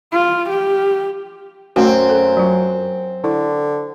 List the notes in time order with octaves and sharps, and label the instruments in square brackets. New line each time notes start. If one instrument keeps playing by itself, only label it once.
[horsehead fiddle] F4
G4
[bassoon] F#2 [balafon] A3 C#4 F#4 [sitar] C4
[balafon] A4
F#3 F4
[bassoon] D3 [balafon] E4